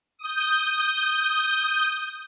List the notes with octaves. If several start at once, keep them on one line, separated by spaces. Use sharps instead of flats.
D#6 G6